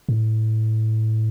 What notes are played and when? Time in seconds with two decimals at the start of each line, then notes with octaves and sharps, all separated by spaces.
0.09 A2